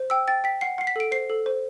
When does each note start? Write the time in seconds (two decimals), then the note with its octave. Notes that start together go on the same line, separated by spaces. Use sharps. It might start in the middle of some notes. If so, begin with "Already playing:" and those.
Already playing: C5
0.10 G5 E6
0.28 G5 A6
0.44 G5 B6
0.61 F#5 C7
0.78 F#5 C7
0.87 B6
0.96 A4 D7
1.12 C5 C7
1.30 A4
1.46 C5